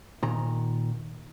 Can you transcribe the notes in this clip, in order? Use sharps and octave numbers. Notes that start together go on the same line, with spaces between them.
A#2 D#3 A#5